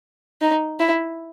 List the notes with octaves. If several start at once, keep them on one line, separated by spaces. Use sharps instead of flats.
D#4
E4